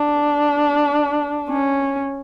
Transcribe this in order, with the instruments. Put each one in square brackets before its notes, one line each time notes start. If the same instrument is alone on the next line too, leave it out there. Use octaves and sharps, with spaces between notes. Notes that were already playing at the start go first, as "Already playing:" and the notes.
Already playing: [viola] D4
C#4